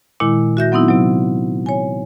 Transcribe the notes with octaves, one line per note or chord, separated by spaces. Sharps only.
A#2 D#3 G#3 E4
F#4 E5 G6 A#6
F#3 B3 C4 D#4 E4
C3 F#3
C#5 G#5